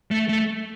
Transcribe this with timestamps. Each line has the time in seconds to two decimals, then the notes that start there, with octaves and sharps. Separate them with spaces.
0.11 A3
0.29 A3